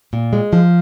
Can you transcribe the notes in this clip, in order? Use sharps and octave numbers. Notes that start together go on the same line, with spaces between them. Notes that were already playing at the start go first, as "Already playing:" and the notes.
A#2
G#3
F3